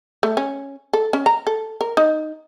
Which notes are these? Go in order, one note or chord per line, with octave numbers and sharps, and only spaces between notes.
A3
C#4
A4
C#4
A#5
A4
A#4
D#4